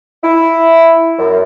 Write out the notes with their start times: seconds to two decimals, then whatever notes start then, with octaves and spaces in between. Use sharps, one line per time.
0.24 E4
1.19 F#2